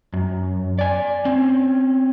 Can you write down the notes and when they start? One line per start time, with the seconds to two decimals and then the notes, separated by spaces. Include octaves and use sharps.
0.13 F#2
0.79 D5 G#5
1.25 C4 C#4